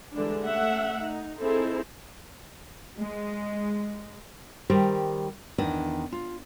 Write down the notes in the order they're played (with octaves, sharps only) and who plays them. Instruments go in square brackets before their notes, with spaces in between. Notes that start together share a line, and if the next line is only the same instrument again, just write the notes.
[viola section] D3 E3 G3 G#3 D4
A3 C#4 E5 F#5
D#4
C4 D#4 E4 G#4 A4 C5
[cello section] G#3
[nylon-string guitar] D#3 G3 G4 A#4 C5
E2 D#3 D4 D#5
F4